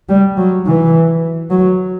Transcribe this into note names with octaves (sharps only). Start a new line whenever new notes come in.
G3
F#3
E3
F#3